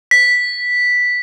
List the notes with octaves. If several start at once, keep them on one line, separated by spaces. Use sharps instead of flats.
B6